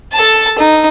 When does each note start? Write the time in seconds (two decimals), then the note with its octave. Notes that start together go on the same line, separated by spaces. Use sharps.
0.13 A4 A5
0.58 D#4